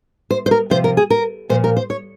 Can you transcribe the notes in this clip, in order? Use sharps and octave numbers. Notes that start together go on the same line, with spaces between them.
C5
C5
A#4
C3 F3 C5
A#4
G#4
A#4
A#2 F3 C5
A#4
C5
C#5